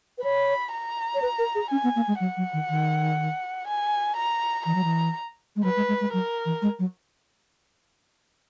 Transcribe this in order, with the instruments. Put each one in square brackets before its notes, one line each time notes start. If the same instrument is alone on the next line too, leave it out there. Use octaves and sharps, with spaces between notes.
[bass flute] B4
[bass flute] C#5 [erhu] B5
[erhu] A#5
[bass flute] C#5
B4
A#4
G#4
[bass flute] C#4 [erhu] G#5
[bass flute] B3
A#3
G#3
[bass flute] F#3 [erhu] F#5
[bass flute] F#3
D#3
D#3
[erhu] G#5
A#5
[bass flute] E3 [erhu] A#5
[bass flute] F#3
E3
G#3
[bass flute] F#3 [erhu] B4
[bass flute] G#3
G#3
G#3
[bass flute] F#3 [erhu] A#4
[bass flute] E3
G#3
F#3